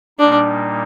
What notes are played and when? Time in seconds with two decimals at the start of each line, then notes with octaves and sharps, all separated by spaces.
0.19 A#2 G3 A#3 D4 D#4